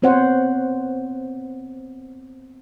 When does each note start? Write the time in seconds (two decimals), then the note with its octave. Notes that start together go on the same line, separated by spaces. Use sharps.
0.02 B3 C4 C5 C#5 F#5